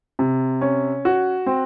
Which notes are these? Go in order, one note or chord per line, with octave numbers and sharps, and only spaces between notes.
C3
C#4
F#4
C4